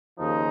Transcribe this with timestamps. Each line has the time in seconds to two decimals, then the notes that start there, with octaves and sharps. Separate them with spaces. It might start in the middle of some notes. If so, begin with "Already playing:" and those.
0.17 D#2 C#3 F3 D#4